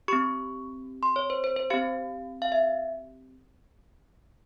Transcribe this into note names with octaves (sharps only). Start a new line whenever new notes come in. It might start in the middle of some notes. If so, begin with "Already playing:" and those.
C4 G4 C#6
C6
C#5
C5
C5
C5
C4 G4 F5
F5
E5